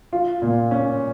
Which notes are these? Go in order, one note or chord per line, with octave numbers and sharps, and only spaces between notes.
F4
A#2
C#4